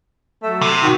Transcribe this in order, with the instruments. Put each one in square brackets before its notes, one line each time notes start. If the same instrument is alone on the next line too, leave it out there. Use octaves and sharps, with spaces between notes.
[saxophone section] F#3 A3 A4
[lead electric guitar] C3
[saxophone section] D#3 F#4